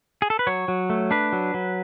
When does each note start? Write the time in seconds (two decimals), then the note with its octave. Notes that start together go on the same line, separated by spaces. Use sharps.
0.22 G#4
0.30 A4
0.39 B4
0.47 F#3 C#5
0.68 F#3
0.90 A3
1.11 D4 B4
1.33 F#3
1.54 F#3